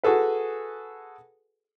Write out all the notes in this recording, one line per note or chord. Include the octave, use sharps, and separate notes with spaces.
F#4 G#4 A4 B4